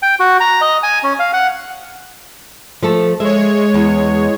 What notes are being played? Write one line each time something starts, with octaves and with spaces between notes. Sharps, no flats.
G5
F#4
A#5
D#5
G#5
C#4
F5
F#5
F3 A3 A4
G#3 C#5 E5
E2